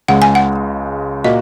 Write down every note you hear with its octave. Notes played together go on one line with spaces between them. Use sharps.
C#2 C#3 G#3 F#5
G#5
F#5
A#2 A#3 F#4 D#5